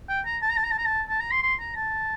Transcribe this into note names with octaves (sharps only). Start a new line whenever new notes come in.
G5
A#5
A5
A#5
A5
A#5
A5
A#5
A5
A5
A#5
C6
C6
A#5
A5